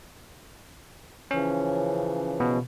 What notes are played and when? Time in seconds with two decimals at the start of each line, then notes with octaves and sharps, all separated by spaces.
1.31 C#3 E3 F3 C#4
2.40 B2